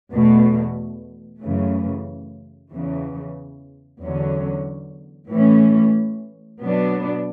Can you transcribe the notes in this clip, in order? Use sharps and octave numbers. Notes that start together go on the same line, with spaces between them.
E2 B2 A3
F#2 C#3 E3 A3
E2 C#3 E3
E2 D3 F#3 C#4
A2 E3 A3 C#4
B2 F#3 B3 D4